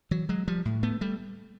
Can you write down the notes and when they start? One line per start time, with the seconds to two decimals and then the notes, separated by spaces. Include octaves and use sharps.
0.11 E3 F#3
0.29 F#3 G#3
0.48 F3 G3
0.65 A2
0.83 A3 B3
1.01 G3 A3